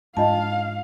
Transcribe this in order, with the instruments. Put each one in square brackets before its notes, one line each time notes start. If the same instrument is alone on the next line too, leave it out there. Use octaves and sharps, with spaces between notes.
[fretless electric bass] G#2 [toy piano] D4 F4 D#5 [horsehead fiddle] F5 [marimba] A5